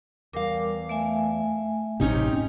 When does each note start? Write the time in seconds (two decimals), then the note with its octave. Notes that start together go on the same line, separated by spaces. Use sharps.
0.33 E2 G3 A#4 F5 D6
0.89 A3 E5 G#5
2.00 A1 F#2 C3 C#4 D#4 G4